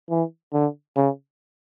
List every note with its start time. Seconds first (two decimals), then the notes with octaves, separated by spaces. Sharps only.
0.10 E3
0.53 D3
0.96 C#3